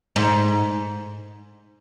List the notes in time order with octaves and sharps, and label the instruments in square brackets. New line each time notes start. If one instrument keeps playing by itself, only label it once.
[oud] G#2